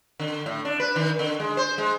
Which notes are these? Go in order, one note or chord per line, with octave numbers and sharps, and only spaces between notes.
D3
A2
D4
B4
D#3
D3
G#3
C5
G#3